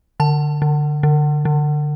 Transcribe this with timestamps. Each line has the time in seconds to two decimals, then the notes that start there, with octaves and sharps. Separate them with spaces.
0.20 D3 A5
0.62 D3
1.03 D3
1.45 D3